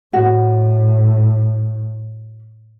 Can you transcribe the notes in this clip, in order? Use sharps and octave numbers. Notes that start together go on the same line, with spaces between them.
A2 F#4